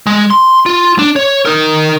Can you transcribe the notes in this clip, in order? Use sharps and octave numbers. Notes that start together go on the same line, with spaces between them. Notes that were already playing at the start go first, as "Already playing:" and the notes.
G#3
C6
F4
D4
C#5
D#4 A#4